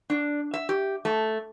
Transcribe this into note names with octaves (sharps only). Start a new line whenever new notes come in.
D4
E5
G4
A3